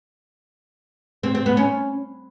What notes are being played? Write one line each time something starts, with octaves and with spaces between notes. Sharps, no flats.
C4
C4
B3
C#4